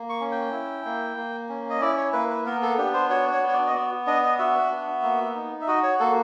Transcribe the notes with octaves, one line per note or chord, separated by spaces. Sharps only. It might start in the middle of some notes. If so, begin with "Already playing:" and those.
Already playing: A#3
C#6
C#4
G5
E4
A#3
A#3
C#4
D#5
E4 D5
C#5
A#3 B4
B4
B3 A#4
A4
D4 G4
C5
F#4 C#5
C#5
B3
C#5
D5
D#5
B3 D5
D4 D#5
D#5
F#4 E5
B3
A#3
D#4
E5
F#4 D#5
C#5
A#3 A4